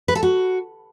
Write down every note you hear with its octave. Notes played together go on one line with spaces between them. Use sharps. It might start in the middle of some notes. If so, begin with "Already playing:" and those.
B4
A4
F#4